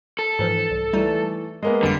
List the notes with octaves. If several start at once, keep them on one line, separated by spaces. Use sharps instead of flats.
A4
G#2 E3 F3
C2
E3 G3 A3 D#4
G#3 A#3 B3
G1 F2 D3 G3 C7